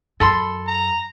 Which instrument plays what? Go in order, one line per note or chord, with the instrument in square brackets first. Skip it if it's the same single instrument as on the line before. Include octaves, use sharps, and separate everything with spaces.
[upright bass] F#2 [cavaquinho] A4 B5 C6
[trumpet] A#5